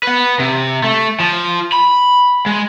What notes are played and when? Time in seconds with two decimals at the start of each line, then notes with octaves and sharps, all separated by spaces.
0.03 B4 F#5
0.39 C3
0.84 A3
1.20 F3
1.72 B5
2.46 G#3